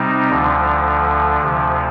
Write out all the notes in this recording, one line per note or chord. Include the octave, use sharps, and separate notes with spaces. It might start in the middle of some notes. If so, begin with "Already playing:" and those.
Already playing: C3 G3 C4 D#4
D2 D3 F3
D2 C3 F3